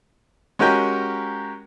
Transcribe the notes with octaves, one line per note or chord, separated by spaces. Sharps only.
G#3 C#4 F#4 G4 A#4 G5